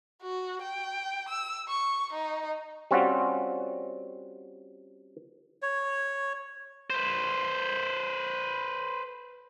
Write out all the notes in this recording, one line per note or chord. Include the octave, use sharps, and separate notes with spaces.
F#4
G5
E6
C#6
D#4
G3 C4 C#4 F4 F#4
C#5
B4 C5